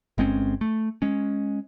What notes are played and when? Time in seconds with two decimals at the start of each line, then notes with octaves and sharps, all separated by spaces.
0.18 G1 G#3 C4 C#4
0.61 A3
1.02 G#3 C#4